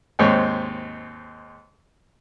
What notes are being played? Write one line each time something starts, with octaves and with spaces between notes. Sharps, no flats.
D#2 G#2 C4 C#5